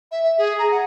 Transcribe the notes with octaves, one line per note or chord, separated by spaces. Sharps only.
E5
E5
G#4
A#5
F#5